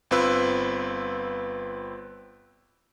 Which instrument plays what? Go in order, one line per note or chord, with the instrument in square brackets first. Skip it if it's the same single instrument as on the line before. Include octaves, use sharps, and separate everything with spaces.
[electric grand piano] G1 C4 F4 B4 E6